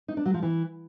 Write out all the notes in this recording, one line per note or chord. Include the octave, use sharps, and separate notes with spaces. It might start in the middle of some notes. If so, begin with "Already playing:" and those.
D#4
D4
F#3
F3
E3